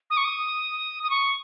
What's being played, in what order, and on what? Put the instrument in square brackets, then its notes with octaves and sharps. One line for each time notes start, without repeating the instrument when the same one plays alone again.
[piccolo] D#6
C#6
D#6
D#6
C#6